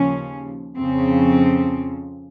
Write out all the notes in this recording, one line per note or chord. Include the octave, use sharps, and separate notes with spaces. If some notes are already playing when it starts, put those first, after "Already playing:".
Already playing: D#2 C#3 F3 C#4
F2 C#3 F3 C4